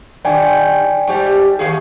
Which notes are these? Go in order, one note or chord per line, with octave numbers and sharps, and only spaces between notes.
G2 B2 D#3 D5 G5 G#5
G#2 G3
D#2 A#3 G#4